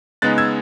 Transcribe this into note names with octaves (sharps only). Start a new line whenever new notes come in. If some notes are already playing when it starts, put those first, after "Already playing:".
C#3 G#3 B3 D#4 F#6 A6
E6 G#6